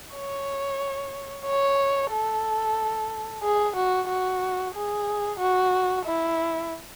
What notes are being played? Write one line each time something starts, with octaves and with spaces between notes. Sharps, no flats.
C#5
C#5
A4
G#4
F#4
F#4
G#4
F#4
E4